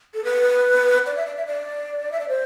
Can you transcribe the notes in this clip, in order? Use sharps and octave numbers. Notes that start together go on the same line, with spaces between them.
A4
B4
D5
E5
D5
E5
D5
E5
D5
C5